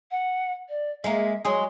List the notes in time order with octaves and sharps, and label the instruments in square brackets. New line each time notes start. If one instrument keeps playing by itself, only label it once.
[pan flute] F#5
D5
[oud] G#3 A#3 [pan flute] E5
[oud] F#3 G#3 G#4 [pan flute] C6